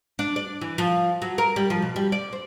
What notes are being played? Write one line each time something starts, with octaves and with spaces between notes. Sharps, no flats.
D4
D5
E3
F3
F#3
A#4
G3
F3
B2
G3
D5
C4